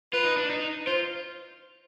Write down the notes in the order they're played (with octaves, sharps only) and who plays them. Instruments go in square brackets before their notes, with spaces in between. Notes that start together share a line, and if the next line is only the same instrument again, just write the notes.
[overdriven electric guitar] F4 [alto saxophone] B4
[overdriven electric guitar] D#4
D4
D#4
[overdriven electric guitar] F4 [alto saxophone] C5